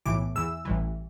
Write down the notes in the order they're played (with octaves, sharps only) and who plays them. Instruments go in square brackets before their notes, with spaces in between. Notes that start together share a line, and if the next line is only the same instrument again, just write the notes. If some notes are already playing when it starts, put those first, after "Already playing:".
[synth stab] B1 A2 E3 D6
E2 E3 E6
A1 G2 E3